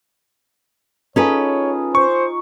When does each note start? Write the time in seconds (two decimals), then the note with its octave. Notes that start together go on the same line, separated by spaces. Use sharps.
1.16 C#4 D#4 F4 G#4 A4 B4 C#5
1.95 C5 C#6